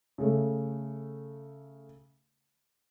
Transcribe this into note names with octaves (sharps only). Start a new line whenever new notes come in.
C#3 A3